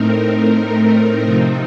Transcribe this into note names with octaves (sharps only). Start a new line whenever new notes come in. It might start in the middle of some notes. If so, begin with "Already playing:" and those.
Already playing: A2 A3 C4 D#4 A#4
C3 F3 C4 D#4